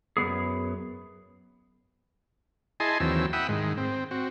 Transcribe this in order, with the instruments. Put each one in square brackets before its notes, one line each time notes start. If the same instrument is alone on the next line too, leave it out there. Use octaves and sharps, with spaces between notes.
[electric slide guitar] F#2 E3 B3 G#4
[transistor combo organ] E4 G#4 D#5 G#5 A5 C6
D#2 E3 F#3 C4 E6
E5 F#5 G5 B5 D#6 E6
G#2 D#3 G#3
C4
C4 F#4